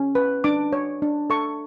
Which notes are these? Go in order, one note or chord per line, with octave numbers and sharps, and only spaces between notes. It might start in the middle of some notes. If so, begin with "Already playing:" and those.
Already playing: C#4
B4
D4 D6
C#5
D4
A4 C#6